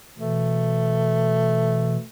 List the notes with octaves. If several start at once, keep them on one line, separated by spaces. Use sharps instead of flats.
B2 E3 A3